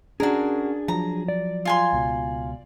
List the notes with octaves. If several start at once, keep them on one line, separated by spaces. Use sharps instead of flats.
C#4 D4 F#4 G#4 A#4
F3 F#3 A#5
D5
F4 G#5 C6
C#2 B2